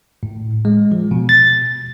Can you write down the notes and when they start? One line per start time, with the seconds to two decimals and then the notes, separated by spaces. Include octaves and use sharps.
0.23 A2
0.65 G#3
0.92 F3
1.11 B2
1.29 A6